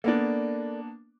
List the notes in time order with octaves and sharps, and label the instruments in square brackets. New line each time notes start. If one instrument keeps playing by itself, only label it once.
[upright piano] A#3 B3 D4 [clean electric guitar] A4 A#4 D5